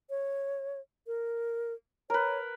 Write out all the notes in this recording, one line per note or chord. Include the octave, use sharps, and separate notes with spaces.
C#5
A#4
A#4 B4 C#5